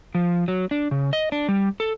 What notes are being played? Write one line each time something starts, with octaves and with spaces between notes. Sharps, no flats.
F3
F#3
D4
C#3
D#5
D4
G3
A4